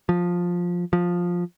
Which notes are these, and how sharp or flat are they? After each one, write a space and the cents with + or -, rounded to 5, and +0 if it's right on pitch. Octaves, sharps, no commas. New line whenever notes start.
F3 +10
F3 +10